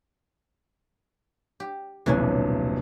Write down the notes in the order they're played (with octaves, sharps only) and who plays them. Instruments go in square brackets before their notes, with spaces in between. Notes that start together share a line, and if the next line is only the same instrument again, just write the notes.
[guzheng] G4
[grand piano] D#1 B1 C3 [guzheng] E3 C#4 D4